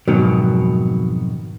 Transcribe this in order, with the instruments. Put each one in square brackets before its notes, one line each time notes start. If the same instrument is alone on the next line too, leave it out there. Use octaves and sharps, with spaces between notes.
[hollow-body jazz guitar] F2 G#2 B2 D#3 F#3